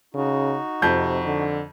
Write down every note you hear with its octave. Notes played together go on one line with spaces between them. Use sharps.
C#3 D#4 F#4
F2 C3 G6
D3